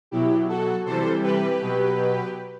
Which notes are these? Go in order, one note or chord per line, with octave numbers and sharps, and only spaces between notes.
B2 F#3 E4 G4
F#4 A4
C3 E3 G3 A4 C5
G4 B4
B2 F#3